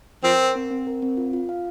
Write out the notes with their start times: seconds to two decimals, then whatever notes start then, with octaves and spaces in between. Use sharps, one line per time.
0.24 F3 C4 A#4
0.39 A#4
0.55 C4
0.71 C4
0.87 A#4
1.02 C4
1.17 F4
1.33 F4
1.49 F5